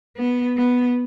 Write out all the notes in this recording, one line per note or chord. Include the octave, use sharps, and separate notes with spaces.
B3
B3